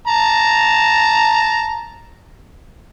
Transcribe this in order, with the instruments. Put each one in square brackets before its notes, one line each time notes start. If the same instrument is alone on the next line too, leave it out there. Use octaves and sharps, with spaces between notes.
[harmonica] A5 A#5